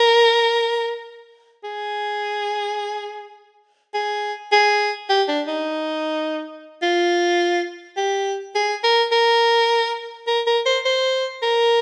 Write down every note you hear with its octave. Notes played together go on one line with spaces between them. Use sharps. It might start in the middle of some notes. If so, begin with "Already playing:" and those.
Already playing: A#4
G#4
G#4
G#4
G4
D4
D#4
F4
G4
G#4
A#4
A#4
A#4
A#4
C5
C5
A#4